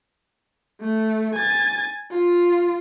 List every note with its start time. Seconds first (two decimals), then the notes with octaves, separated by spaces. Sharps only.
0.82 A3
1.35 G#5 A6
2.12 F4